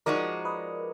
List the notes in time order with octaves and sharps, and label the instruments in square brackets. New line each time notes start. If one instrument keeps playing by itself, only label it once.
[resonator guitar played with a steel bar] F3 G#3 D#4 F#4 [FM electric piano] A#4 D5
[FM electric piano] B4 D#5